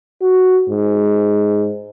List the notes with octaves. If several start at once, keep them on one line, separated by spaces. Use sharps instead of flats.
F#4
G#2